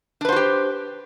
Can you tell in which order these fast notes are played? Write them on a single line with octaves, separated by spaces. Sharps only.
D4 B4 C5 F#4 G4